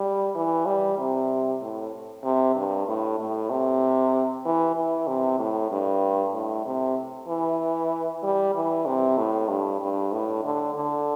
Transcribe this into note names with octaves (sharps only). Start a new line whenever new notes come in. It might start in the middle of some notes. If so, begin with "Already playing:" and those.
Already playing: G3
E3
G3
C3
A2
C3
G2
A2
A2
C3
E3
E3
C3
A2
G2
A2
C3
E3
G3
E3
C3
A2
G2
G2
A2
D3
D3